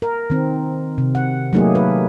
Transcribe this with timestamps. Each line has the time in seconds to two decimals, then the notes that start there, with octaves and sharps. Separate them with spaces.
0.02 A#4
0.30 D#3 C4
0.98 C3
1.15 F#5
1.53 F#3 A3 A#3 D#4 G4 G#4
1.75 B4